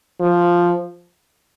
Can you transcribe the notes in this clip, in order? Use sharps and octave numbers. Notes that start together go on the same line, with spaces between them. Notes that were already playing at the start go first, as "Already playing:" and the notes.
F3